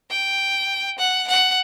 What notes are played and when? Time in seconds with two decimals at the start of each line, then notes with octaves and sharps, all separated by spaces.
0.11 G5
0.98 F#5
1.28 F#5